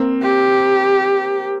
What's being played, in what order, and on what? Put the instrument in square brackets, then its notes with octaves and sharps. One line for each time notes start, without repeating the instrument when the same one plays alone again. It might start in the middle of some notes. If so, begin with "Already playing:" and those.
Already playing: [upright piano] A#3 C4
[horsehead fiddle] G4